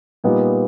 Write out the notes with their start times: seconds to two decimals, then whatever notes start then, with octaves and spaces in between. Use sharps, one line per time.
0.24 A#2 G3 B3 D#4